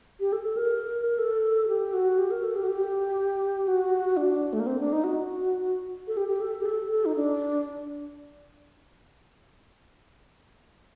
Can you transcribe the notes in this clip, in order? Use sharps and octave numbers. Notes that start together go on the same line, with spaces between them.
G4
A4
A4
A#4
A4
G4
F#4
G4
A#4
A4
G4
F#4
G4
F#4
D4
A3
A#3
C4
D4
D#4
F#4
A4
G4
G4
A4
G4
A4
A4
D#4
D4